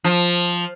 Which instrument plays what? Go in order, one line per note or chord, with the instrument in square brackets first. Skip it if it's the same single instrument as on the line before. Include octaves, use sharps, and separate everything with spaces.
[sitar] F3